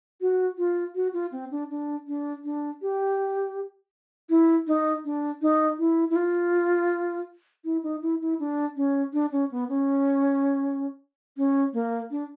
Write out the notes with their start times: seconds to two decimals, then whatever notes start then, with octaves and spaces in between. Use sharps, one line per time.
0.21 F#4
0.58 F4
0.95 F#4
1.13 F4
1.32 C4
1.51 D4
1.70 D4
2.07 D4
2.44 D4
2.82 G4
4.30 E4
4.67 D#4
5.05 D4
5.42 D#4
5.79 E4
6.10 E4
6.16 F4
7.65 E4
7.83 D#4
8.02 E4
8.21 E4
8.39 D4
8.76 C#4
9.13 D4
9.32 C#4
9.51 B3
9.69 C#4
11.37 C#4
11.73 A#3
12.11 D4